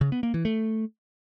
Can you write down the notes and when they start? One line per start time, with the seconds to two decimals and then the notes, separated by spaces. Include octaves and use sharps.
0.01 C#3
0.12 B3
0.23 A#3
0.34 E3
0.45 A3